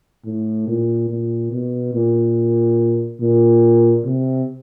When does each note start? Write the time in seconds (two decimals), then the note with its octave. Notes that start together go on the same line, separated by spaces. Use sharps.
0.25 A2
0.68 A#2
1.10 A#2
1.52 B2
1.94 A#2
3.21 A#2
4.05 C3